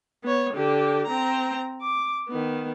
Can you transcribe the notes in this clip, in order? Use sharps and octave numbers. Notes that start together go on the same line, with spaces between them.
B3 C#5
D3 G4
C4 A#5
D6
D#3 B3